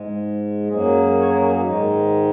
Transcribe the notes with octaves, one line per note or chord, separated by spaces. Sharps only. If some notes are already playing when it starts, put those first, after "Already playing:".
Already playing: G#2 G#3
F#2 F#3 A#3 G#4
C#5
A#4
G#4
F#4
G#2 D#3 G#3 D#4